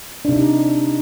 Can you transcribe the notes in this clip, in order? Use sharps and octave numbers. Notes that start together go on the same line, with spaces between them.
C3 D4 D#4